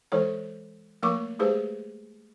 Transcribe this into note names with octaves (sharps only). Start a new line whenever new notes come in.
E3 G#3 A4 C5 C#5
F3 A3 A#3 A#4 C#6 D6
G#3 A3 G4 G#4 B4 C5